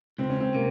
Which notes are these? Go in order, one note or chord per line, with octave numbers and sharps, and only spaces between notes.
C#2 C4
C#4
C4
C3 A#3